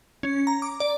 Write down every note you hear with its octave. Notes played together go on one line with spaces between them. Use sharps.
C#4
A#5
D6
D5